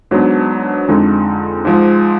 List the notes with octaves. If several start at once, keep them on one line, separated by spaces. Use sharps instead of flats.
G#2 F#3 B3 D4
F2 D3 G#3 D#4
G#2 F3 G#3